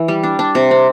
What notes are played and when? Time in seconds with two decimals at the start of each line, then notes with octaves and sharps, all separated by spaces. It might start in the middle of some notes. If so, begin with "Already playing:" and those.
Already playing: E3
0.08 G3
0.23 D4
0.39 D4
0.55 C3
0.71 C4